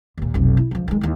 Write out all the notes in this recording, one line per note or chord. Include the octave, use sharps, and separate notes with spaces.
D#2 A#2
F1 B1
E4
C#2 F3
D#3 G#3
D#2 E4